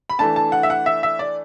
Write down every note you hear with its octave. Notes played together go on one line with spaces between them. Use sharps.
B5
E3 A3 D4 A5
A5
F#5
E5
F#5
E5
E5
D5